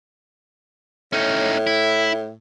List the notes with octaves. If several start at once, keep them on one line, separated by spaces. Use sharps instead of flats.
A2 C#4 D#4
E4